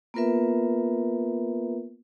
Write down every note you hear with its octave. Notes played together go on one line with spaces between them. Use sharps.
A#3 B3 F4 A#4 B4 E5